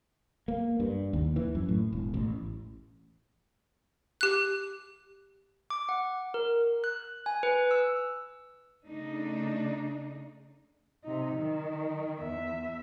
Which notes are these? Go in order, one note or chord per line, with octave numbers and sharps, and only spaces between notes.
A#3
G2
D#2
E3
F#2
A2
E1
A1
G4 F#6
D6
F#5
A#4
F#6
G#5
B4
E6
C#3 A3 D4 D#4
C3 D#4
D#3
E2 E5